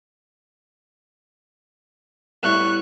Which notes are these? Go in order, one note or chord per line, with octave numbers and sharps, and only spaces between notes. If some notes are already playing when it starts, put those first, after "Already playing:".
A2 G3 B3 C#6 F#6